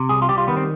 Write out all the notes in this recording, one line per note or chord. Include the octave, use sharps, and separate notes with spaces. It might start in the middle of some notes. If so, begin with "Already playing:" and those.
Already playing: C3
C2 G#4
F4
G3 G4
F4
D#3 B3
C4